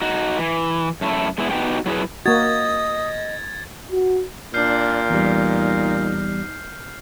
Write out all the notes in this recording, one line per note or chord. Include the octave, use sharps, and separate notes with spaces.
D#4 F#4
E3
F#2 A3 E4
G#3 B3 E4
B3 D#4 F#4 G4 B4 G5
F#3 E4 G#4 B4
A#3 F#4 D#5 D#6 G#6 A6
F#4
A#2 D4 F6 G6 C7
E2 G3 D#4